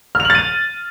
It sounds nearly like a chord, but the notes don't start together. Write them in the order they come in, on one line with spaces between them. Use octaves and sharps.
F6 F7 F#7 A6 D#7